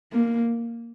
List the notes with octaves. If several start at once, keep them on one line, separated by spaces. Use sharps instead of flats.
A#3